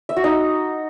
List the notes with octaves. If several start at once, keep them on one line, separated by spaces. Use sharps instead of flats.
E5
F#4
D#4